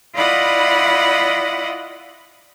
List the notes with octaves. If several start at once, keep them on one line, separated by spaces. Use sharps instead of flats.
E4 F4 D5 D#5 F#5 B5